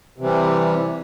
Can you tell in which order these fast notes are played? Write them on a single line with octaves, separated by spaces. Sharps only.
C3 E3 G3